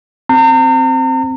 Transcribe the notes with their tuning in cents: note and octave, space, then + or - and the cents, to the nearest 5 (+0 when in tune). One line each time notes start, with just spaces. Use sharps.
C4 +0 A#5 -40